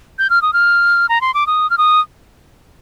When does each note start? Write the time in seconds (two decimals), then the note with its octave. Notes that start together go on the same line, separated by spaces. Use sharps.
0.19 G6
0.30 F6
0.42 D#6
0.53 F6
1.09 A#5
1.21 C6
1.34 D6
1.47 D#6
1.70 F6
1.78 D#6